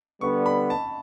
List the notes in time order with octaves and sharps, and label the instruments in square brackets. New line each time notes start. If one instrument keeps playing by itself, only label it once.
[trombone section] D3 G3 B3 [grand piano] C#6
[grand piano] B5
A5